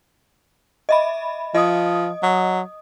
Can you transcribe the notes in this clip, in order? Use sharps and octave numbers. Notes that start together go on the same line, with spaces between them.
D#5 E5 B5
F3 D#5 D#6
F#3